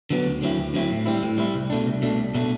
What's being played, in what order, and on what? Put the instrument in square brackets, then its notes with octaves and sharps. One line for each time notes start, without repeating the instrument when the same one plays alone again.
[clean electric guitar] D3 F#3 B3
D2
D3 F#3 C4 E4
D2
D3 F#3 C4 E4
A2
G3 C4 E4
A2
G3 C4 E4
C2
B2 A3 D4
C2
B2 A3 D4
C2
B2 A3 D4